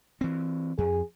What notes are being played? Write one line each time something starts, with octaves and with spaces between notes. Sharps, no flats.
E3 C4
F2 G#4